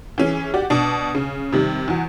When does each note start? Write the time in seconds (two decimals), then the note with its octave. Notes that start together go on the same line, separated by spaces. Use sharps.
0.18 E3 C#4 G#4
0.54 F#4 G4 D5
0.70 B2 D4
1.15 C#3
1.53 C3 D#3 G3
1.88 E2 F#4